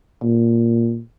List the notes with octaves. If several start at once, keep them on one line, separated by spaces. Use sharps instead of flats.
A#2